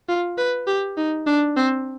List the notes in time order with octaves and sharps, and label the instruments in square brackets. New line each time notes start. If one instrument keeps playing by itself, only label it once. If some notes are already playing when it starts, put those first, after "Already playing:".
[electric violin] F4
B4
G4
D#4
D4
C4